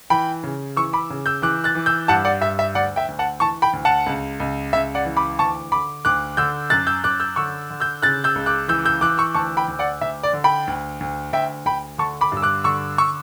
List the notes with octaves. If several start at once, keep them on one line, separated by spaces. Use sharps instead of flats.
E3 G5 B5
C#3
E3 C#6 E6
B5 D6
C#3
E6 G6
E3 D6 F#6
F#6 A6
E3
E6 G6
G2 F#5 A5
D5 F#5
G2 E5
E5
D2 D5 F#5
E5 G5
D2
F#5 A5
E3 A5 C#6
G5 B5
D2
F#5 A5
C#2
C#2
C#2 E5
D5 F#5
E3
B5 D6
D2 A5 C#6
D3 B5 D6
D2 D6 F#6
D3 E6 G6
F#2 F#6 A6
E6 G6
F#2 D6 F#6
E6 G6
D3 C#6 E6
D3
E6 G6
C#3 F#6 A6
E6 G6
C#2
D6 F#6
E3 E6 G6
E6 G6
E3 D6 F#6
C#6 E6
D2 A5 C#6
G5 B5
D2
D5 F#5
D2 E5
D5
D3
G5 B5
D2
D2
D2 E5 G5
D2 G5 B5
D3 A5 C#6
B5 D6
G2
E6
D6 F#6
D3 C#6 E6
C#6 E6